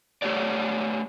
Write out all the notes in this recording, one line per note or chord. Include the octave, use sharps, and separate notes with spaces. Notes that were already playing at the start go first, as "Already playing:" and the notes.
A3 G4 C#5 D5